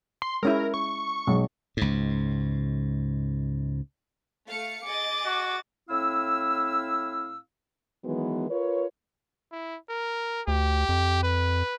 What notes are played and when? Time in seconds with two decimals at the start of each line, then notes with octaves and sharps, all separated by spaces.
0.22 C6
0.43 G#3 C#4 E4 A#4
0.74 C#6
1.27 B1 G#3
1.77 C#2 G#2
4.48 A3 F5 C#7
4.85 G#4 D#5 D6 A6
5.26 F#4
5.89 A2 C4 E4 F5 E6
8.04 D#3 E3 F#3 G#3 B3
8.50 F4 A#4 B4 C#5
9.52 E4
9.89 A#4
10.48 D2 G4
10.89 F2
11.23 B4